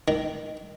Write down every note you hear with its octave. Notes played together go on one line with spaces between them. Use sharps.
D#3